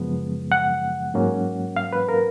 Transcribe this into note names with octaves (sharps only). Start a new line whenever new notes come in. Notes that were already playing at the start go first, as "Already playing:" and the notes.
Already playing: F#2 C#3 F3 G#3 B3
F#5
G#2 F#3 A#3 C#4
F5
B4
A#4